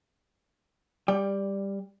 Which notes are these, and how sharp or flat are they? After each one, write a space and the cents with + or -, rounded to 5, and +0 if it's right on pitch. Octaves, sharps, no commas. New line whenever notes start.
G3 +15 D5 +0 G5 +30